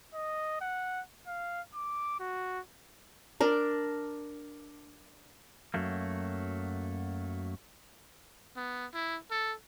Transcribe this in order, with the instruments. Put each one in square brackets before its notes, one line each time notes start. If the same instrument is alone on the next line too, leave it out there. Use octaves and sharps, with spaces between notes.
[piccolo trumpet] D#5
F#5
F5
D6
F#4
[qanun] D4 A#4
[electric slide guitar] F#2 F#3 A3 A#3
[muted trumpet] B3
E4
A4